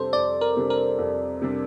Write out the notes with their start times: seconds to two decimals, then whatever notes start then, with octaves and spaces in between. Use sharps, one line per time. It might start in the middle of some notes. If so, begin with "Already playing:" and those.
Already playing: F2 C3 G3 D4 A4 C5
0.13 F2 D5
0.41 A#4
0.57 C3 G3 D4
0.70 A#4
0.98 F2
1.42 C3 G3 D4